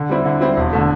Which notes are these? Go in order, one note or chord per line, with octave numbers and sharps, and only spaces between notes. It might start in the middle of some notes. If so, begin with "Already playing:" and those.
Already playing: D3
G3 C4 E4
D3
G3 C4 E4
E1
D3 A3